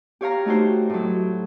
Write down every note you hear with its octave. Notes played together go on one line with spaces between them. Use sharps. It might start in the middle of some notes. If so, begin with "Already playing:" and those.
G4 C#5 F5 A#5
A3 D#4 F#4 G4 C5
A2 F#3